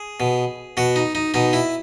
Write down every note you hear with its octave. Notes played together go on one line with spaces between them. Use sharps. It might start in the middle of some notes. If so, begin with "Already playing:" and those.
Already playing: G#4
B2
B2 F#4
D#4
D#4
B2 D#4
E4